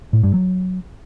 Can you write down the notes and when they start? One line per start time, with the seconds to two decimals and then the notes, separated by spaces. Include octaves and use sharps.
0.13 A2
0.23 G2
0.34 F#3